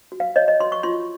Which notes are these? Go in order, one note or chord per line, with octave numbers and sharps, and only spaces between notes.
F#4
F5
C#5 D#5
D#5
F#4 C6
C#6
F4 C6